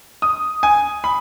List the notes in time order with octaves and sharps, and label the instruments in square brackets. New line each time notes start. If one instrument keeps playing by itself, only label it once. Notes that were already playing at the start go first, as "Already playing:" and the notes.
[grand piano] D#6
G#5
B5